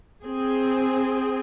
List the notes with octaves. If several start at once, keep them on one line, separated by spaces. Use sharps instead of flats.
C4 G#4